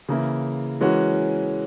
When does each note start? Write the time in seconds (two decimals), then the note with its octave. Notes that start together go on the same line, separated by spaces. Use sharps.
0.09 C#3 E3 A#3 E4
0.81 E3 G#3 C#4 F#4 A#4